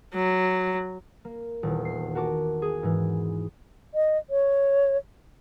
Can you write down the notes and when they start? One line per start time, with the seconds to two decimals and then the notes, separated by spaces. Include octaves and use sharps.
0.14 F#3
1.25 A#3
1.63 D#1 E2
1.85 C7
2.15 F#4 A#4 A5 D6
2.62 G#4
2.83 G#2 E3
3.94 D#5
4.30 C#5